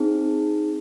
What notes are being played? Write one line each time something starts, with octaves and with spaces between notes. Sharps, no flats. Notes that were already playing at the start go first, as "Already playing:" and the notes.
Already playing: C4 D#4 G#4